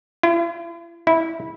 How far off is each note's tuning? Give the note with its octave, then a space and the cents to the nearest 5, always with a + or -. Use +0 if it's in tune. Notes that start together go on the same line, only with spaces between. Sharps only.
E4 +45
E4 -15